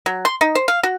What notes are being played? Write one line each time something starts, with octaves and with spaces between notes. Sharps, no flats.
F#3
C6
D#4
C5
F5
F#4